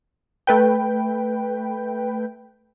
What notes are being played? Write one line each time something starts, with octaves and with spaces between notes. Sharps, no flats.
A3 B4 G5